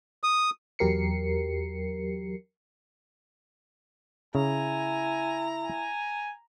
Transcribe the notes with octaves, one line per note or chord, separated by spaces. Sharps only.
D#6
E2 F#3 G4 A#4 C7 C#7
C#3 E4 G#5 A#5
G#5